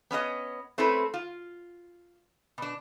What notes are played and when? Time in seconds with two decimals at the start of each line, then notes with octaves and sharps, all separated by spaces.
0.11 B3 C#4 D4 D#5
0.78 A3 C4 C#4 E4 A4 B4
1.14 F4
2.58 B2 D4